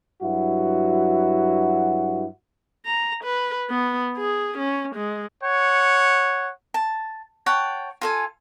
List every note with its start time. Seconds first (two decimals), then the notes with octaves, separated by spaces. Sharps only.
0.22 G2 F#3 E4 F#4
2.86 A#5
3.24 B4
3.70 B3
4.17 G#4
4.58 C#4
4.96 G#3
5.44 C#5 F#5
6.74 A5
7.46 C#5 F#5 G5 A5
8.01 F4 A4 G#5